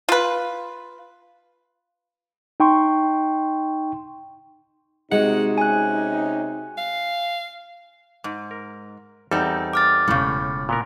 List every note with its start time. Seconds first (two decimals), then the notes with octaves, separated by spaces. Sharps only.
0.09 F4 B4
2.60 D#4 G5 C6 C#6
5.12 C3 G#3 D#4 F#4 F#5
5.58 C#4 G#5 F#6
6.78 F5
8.24 G#2
8.51 A#4
9.31 E2 G3 C4 D#4 A4
9.73 D6 F6 A6
10.08 E1 A2 C#3 F4
10.69 A#2 B3 A#4